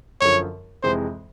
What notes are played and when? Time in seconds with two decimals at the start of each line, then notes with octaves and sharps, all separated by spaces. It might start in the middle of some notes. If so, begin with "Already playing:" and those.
0.21 F#2 D3 F3 C#5
0.83 F2 C3 E3 G#3 C5